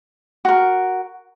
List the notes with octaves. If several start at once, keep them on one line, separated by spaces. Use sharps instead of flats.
F#4 A#4